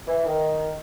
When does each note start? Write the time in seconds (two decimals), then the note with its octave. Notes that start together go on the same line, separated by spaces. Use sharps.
0.07 E3
0.26 D#3